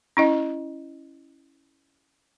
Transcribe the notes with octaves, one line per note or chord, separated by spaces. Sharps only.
C#4 E4 D#5